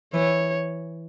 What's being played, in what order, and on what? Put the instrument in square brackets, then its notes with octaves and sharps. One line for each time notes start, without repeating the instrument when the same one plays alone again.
[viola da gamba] E3 [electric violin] C#5